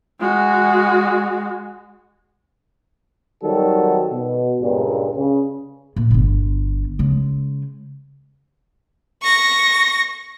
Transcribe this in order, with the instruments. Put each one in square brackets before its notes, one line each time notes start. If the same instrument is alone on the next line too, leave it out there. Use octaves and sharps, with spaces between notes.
[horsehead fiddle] G#3 F#4
[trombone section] D#3 F#3 G3 C4 F#4 A4
B2
C#2 G2 A#2
C#3
[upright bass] A#2
G1 D3
C#3 G#3
[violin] C#6 A#6